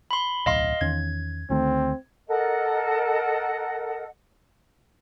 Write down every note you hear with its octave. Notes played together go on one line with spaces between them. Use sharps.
B5 C6
D1 B1 D#5 F5 C6
E2 D#3 C#4 G#6
D2 D#3 A3 C4
A4 A#4 D#5 F#5